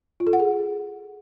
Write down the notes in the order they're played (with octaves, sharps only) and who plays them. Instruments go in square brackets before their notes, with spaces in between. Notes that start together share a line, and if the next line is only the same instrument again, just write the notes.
[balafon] F4
A4
F#5
G#4